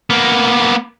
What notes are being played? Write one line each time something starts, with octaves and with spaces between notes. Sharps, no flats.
A#3 B3